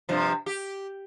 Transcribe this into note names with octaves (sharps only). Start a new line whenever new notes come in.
G2 C3 F3
G4